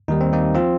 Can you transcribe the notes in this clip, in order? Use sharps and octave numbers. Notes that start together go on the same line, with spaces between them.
D#2 D#3 G3 D#4
C4
A#3 D#4
F3 C4 F4